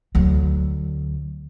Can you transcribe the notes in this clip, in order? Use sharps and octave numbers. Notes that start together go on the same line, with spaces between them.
D2 F#3